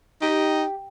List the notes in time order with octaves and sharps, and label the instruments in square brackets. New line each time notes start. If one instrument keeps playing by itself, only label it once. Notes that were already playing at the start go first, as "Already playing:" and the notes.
[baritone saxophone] D#4 [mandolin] G4